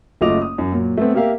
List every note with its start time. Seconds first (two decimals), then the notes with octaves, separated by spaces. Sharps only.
0.21 F#1 A3 F4 D#5 D6 F7
0.42 D#6
0.58 F#2
0.72 A#2 F#3
0.97 A3 B3 C4
1.14 A#3 G4 A#4 E5 F5